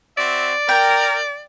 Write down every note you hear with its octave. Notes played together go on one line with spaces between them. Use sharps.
C4 F#4 D5 E5
A#4 G5